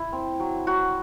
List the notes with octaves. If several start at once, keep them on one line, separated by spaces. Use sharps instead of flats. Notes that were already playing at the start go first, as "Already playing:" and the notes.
Already playing: E4
C4
F#3
F#3 F#4